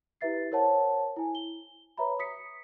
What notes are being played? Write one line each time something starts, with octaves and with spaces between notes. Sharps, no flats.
E4 G4 B4 E5 A6 C7
A#4 C5 C#5 F#5 A5
E4 G#5
G7
B4 C#5 E5 A#5 B5
D#6 B6 C#7